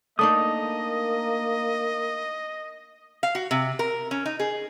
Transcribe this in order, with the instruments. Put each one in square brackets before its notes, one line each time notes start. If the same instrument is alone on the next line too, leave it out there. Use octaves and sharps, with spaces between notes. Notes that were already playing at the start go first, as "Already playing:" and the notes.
[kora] A3 D4 D#4 [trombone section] A#3 [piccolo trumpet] D#5 [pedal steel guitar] D#6
[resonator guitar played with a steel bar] F5
F#4
C3
A#4
C#4
D#4
G#4